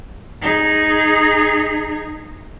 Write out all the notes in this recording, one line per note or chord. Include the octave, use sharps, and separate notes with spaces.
D#4 G#4